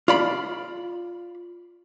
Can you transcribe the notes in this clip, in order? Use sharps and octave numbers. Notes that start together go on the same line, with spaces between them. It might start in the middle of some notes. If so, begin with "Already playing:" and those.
F4 D5 B5